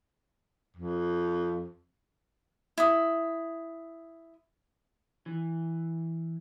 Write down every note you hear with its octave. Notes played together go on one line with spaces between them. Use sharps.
F2
E4 D#6
E3